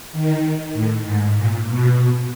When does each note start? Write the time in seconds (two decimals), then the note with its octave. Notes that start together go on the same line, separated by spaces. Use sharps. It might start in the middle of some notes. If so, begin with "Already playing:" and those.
0.12 D#3
0.74 A2
1.04 G#2
1.36 A#2
1.67 B2